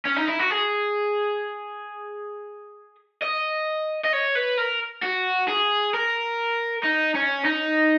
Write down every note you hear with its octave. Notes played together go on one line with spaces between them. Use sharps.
C#4
D#4
E4
F#4
G#4
D#5
D#5
C#5
B4
A#4
F#4
G#4
A#4
D#4
C#4
D#4